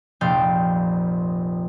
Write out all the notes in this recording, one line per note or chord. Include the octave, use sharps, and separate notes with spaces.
F1 A#1 D5 F5 G5